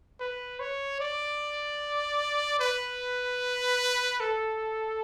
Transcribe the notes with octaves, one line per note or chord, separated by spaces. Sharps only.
B4
C#5
D5
B4
A4